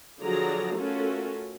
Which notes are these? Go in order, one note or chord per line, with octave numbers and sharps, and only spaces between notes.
D3 F3 F#3 G#4 D5 A#5
A3 C#4 F4 F#4 A4 A#4